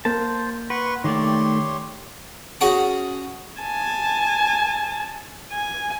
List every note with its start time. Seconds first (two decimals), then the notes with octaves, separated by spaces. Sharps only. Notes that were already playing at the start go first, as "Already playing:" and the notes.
0.05 A#3 C5 A5
0.70 B4 F#5 C6 C#6
1.04 D#3 A3 G4 C#5 D5 C6
2.61 C#4 F#4 G#4 F#5 A5
3.61 G#5 A5
5.53 G#5